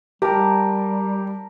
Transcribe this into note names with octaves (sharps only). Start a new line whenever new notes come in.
G3 G4 A#4 A5